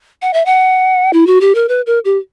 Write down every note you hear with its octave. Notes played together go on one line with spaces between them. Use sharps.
F#5
E5
F#5
E4
F#4
G4
A#4
B4
A#4
G4